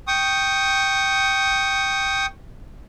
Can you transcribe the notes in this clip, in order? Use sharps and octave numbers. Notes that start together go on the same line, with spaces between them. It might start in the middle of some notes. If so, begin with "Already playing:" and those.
G5 C#6 D#6